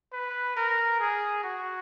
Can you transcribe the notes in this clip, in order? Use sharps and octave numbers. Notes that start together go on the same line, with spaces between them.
B4
A#4
G#4
F#4